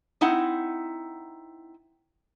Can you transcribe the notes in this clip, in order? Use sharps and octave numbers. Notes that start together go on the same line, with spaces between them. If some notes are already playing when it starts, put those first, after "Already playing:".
C4 D#4 E4 F#5